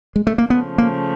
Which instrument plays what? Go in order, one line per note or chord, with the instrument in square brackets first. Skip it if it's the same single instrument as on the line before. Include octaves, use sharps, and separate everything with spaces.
[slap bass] G#3
A3
A#3
[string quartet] C#3 F3 A3 [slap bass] B3
[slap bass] A#3